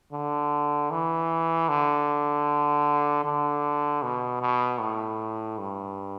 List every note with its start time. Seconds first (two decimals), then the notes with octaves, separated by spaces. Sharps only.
0.12 D3
0.90 E3
1.69 D3
3.24 D3
4.03 B2
4.42 B2
4.80 A2
5.58 G2